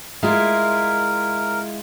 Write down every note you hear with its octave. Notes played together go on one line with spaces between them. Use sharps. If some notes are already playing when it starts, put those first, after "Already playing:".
G#3 E4 F4 A#4